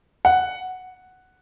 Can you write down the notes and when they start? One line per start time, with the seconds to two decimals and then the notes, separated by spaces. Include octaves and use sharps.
0.25 F#5